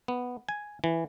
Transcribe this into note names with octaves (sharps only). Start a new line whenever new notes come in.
B3
G#5
E3